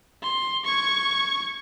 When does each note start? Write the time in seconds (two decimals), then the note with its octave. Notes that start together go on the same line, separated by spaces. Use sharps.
0.22 C6
0.65 C#6 G#6